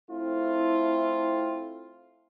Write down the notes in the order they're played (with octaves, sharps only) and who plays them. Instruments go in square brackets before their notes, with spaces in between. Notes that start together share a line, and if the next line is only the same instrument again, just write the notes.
[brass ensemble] A3 C4 E4 F4